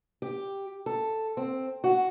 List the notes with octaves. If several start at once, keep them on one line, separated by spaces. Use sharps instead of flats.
G4
A4
C4
F#4